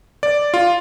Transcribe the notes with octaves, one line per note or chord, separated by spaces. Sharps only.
D5
F4